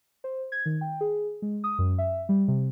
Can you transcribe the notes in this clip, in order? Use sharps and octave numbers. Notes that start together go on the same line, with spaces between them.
C5
G#6
D#3
G5
G#4
G#3
D#6
F#2
E5
G3
C3